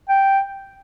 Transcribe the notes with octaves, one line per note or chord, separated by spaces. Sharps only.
G5